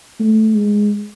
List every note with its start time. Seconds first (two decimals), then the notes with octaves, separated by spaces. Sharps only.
0.20 A3
0.55 G#3